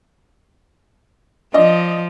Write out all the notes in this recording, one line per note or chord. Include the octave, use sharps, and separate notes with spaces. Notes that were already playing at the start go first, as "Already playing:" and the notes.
F3 D5 D#5